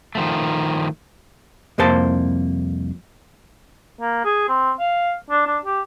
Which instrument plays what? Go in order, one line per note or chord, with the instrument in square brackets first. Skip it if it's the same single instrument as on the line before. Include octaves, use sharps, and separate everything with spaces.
[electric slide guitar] D#3 F3 A3
[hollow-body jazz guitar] C2 F2 A#3 C5 A5
[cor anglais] A#3
G#4
C4
F5
D4
D4
G4